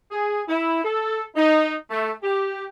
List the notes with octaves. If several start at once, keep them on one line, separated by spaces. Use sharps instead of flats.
G#4
E4
A4
D#4
A3
G4